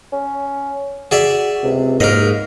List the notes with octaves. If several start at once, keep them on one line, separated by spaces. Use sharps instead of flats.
C#4
F#4 G#4 D5 E5
C#2 C3
G#2 A#3 A#4 D#5